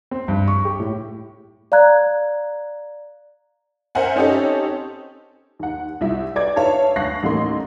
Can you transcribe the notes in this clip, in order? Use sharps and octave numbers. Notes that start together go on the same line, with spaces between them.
C4
G2
C#6
G4
A2
D5 F5 A#5 F#6 G#6
A#4 C5 E5 F#5 G#5
C4 C#4 D#4 G4 A4
D#2 F#5
C2 E4 E5
B4 D5 D6 G#6
B4 C#5 E5 F5 A5
D2 F5 C#6 F#6 A#6 C7
A1 D#2 A3 A#3 C6